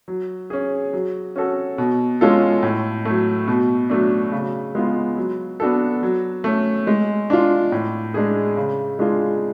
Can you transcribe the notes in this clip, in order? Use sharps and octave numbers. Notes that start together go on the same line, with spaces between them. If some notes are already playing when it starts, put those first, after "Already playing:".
F#3
C#4 G#4
F#3
C#4 F#4 A4
B2
G#3 C#4 F4 A4
A2
F#3 A3
B2
F#3 A3 D4
C#3
G#3 B3 F4
F#3
B3 D4 F#4 A4
F#3
A3 C#4
G#3
D4 F4
A2
G#3 D4 G#4
C#3
G#3 D4 F4 G#4